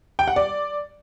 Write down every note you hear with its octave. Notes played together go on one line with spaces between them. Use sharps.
G5
F#5
D5